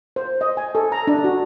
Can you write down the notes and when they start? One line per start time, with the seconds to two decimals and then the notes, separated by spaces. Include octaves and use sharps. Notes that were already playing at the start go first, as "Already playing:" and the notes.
0.16 C5
0.41 D#5
0.57 G#5
0.75 A4
0.92 A#5
1.07 D4
1.24 F#4